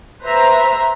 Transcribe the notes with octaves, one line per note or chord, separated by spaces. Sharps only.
B4 C5 E5 A#5